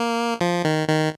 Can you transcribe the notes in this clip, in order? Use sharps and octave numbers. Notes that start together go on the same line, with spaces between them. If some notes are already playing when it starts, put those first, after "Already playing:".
Already playing: A#3
F3
D#3
D#3